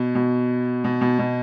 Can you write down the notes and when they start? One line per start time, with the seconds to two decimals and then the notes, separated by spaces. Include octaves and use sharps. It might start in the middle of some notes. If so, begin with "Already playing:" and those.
Already playing: B2
0.15 B2
0.84 B2
1.01 B2
1.19 B2